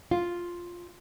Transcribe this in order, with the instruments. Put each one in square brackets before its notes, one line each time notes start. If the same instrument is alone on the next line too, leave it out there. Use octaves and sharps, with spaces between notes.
[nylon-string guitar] F4